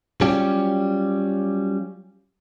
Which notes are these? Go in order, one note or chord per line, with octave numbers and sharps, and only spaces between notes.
F#3 G3 C#4 F4 G4